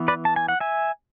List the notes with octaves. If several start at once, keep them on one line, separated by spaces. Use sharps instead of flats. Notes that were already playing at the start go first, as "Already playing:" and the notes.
Already playing: E3 B3
B4 D5
A5
G#5
F#5
E5 G#5